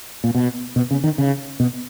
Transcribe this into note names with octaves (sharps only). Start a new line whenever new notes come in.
A#2
B2
B2
C#3
D#3
C#3
B2